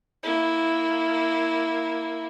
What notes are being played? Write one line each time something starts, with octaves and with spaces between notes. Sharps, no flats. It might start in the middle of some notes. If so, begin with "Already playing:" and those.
A#3 E4